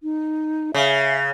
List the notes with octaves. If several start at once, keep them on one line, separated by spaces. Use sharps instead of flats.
D#4
C#3 E5